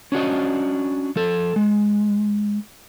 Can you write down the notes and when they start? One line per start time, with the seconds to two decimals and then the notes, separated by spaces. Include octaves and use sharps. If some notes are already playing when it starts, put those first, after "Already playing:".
0.12 C#4 D4 F#4 D#5
1.16 F3 A4
1.56 G#3